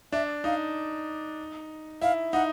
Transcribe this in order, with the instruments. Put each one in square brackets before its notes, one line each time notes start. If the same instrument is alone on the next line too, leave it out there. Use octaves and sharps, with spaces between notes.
[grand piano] D4 [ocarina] E5
[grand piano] D#4 [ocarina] F5
[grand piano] E4 [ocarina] F5
[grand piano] D#4 [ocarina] F#5